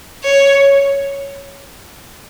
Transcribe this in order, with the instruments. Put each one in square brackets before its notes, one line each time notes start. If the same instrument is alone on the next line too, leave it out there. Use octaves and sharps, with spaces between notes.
[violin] C#5